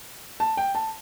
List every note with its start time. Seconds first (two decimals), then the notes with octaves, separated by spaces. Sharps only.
0.40 A5
0.57 G5
0.75 A5